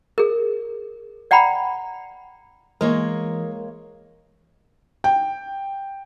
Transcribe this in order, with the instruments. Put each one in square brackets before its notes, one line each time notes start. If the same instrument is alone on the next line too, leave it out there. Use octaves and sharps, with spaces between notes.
[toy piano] G#4 A#4
D5 F#5 G5 A#5 B5
[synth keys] E3 [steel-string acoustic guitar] G#3 A#3 C#5 [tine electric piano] A#4
[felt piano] G5